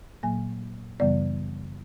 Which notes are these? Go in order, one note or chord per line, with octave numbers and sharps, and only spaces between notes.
A#2 F#3 A#3 G#5
F#2 C#3 E3 G3 B3 D5